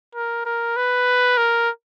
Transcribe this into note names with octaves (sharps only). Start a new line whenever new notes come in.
A#4
A#4
B4
A#4